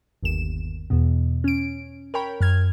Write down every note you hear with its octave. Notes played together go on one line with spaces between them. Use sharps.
G1 D#2 E7
E2 B2
C#4 D7
A#4 C#5 G5 B5
F#2 F6 G#6